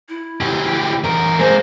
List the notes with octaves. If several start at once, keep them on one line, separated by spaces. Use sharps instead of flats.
E4
D2 G4
E2 A#4
G#3 A#3 C5